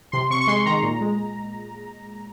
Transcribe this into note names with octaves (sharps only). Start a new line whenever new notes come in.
C3 C6
C3 C#6
C#6
G#3 C6
D#3 A#5
A#2
G#3